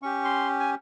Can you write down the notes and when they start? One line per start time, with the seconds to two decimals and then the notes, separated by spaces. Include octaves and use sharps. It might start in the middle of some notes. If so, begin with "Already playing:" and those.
0.02 C#4 G4 C#6
0.25 C6
0.60 G#5